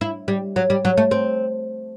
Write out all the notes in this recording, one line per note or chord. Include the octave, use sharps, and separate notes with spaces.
E4
G3
F#3
G3
F#3
A3
C4